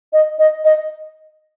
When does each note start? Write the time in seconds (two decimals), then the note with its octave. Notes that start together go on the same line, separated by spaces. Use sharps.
0.13 D#5
0.39 D#5
0.65 D#5